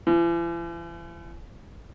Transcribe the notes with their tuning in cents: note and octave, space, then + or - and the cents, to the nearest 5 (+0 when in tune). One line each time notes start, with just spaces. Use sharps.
E3 +45